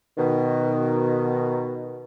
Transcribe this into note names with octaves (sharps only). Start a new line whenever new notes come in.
B2 D#3